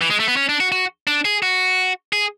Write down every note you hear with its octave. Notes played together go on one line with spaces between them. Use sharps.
E3
G#3
A3
B3
C#4
D4
F#4
F#4
D4
G#4
F#4
G#4